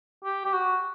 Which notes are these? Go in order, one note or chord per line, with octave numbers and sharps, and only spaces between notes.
G4
G4
F#4